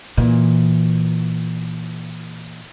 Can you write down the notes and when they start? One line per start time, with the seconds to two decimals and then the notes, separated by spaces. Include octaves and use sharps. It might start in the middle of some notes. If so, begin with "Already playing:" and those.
0.17 A#2 E3